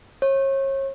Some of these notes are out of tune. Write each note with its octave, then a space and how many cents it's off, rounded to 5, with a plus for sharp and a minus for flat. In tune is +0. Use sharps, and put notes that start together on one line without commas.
C#5 -35